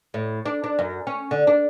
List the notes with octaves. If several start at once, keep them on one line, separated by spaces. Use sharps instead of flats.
A2
D4
D4
F#2
C#4
D3
D4